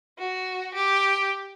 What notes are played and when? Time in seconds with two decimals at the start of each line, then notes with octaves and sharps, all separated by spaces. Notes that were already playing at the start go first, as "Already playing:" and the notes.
0.19 F#4
0.74 G4